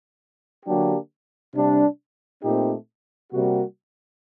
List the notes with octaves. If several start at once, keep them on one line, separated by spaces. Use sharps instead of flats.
D3 F#3 A#3 D4 G4
C3 G3 D4
A#2 A3 C4 D#4 G4
C3 G3 A#3 F#4